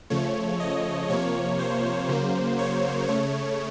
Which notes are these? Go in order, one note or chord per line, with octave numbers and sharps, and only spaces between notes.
C#3 F3 A3 C#5
D#5
C3 F3 A#3 C#5
C5
C#3 F#3 A#3
C#5
C#3 A3 C#5